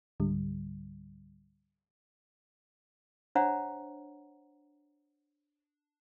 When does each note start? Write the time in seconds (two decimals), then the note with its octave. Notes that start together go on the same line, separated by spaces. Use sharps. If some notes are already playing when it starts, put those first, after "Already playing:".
0.20 C#2 G#2 D3 G3
3.35 D4 C5 C#5 E5 F#5 A#5